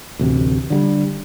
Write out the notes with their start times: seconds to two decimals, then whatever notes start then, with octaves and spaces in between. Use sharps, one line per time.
0.19 A1 D2 C3
0.70 D3 F#3 G3